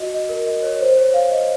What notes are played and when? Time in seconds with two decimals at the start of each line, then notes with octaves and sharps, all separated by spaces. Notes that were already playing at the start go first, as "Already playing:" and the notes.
Already playing: F#4 D#5
0.12 D#5
0.29 A#4
0.47 D#5
0.63 C#5
0.80 C5
0.97 C#5
1.14 F5
1.31 D#5